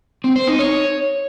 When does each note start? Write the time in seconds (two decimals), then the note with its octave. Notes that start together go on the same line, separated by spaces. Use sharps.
0.24 C4
0.36 C5
0.47 D#4
0.59 C#5